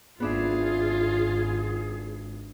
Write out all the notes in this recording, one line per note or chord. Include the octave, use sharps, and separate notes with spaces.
G#1 B3 D4 F4 G#4 E5